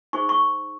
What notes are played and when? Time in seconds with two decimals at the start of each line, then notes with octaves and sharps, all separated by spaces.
0.13 D#4 G#4 C5 C#6
0.29 C#6